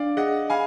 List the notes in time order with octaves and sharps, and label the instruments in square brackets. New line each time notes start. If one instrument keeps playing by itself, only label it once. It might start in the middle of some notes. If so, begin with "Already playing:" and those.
Already playing: [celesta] D4 [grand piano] D5 F5
[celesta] G#4 [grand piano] D#5 F#5
[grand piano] F5 G#5 [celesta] B5